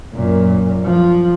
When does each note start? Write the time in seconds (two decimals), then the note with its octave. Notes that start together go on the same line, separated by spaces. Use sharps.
0.14 F#2 A#2
0.84 F3